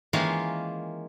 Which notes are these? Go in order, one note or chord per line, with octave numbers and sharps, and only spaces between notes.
D#3 E3 G#3 A#3 C#4 F4